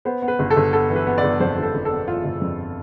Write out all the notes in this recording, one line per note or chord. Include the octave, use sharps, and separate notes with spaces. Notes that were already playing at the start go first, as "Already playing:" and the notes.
B3 C5
B3
B4
G1
A4
G1
B3 A4
E3
B4
B3
D5
G1
F2 C5
G1
A4
G1
A4
B3
E3 F4
G1
F2